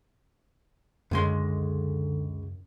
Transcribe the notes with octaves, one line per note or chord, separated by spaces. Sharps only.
C#2 F#2 D3 G#3 C6